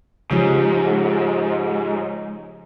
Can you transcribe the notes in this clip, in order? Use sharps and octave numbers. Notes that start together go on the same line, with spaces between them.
G#2 C#3 F3 F4 G4 C#5